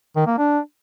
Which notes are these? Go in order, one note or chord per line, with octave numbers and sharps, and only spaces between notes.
D#3
A#3
D4